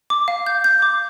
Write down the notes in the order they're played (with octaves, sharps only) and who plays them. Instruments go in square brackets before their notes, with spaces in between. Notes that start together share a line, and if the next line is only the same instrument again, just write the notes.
[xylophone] D6
F5
G6
G6
D6